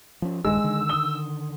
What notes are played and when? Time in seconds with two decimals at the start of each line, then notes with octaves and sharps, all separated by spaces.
0.22 F3 C#4
0.45 D#1 G2 D#3 G#3 E6
0.64 D3 D#3
0.89 D#6 G7